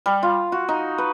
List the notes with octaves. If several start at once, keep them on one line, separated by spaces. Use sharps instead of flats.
G3
F4
F#4
D#4
B4